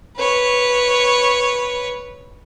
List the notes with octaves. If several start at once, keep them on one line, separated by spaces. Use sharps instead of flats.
B4 C#5